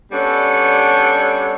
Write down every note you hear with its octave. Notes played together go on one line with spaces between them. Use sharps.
G3 B3 C#4 D4 A4 C#5